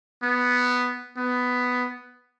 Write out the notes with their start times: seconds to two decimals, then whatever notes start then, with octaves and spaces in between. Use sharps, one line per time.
0.22 B3
1.17 B3